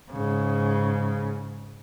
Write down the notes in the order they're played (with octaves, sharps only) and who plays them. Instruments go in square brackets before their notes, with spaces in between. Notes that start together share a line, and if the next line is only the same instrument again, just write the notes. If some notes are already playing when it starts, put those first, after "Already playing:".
[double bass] G#2 C#3